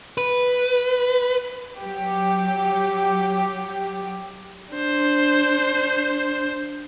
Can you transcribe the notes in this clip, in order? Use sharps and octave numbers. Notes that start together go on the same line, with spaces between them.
B4
F#3 G4
D4 C5